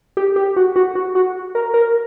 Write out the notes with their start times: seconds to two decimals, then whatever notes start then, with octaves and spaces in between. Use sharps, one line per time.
0.17 G4
0.36 G4
0.56 F#4
0.76 F#4
0.95 F#4
1.15 F#4
1.55 A#4
1.74 A#4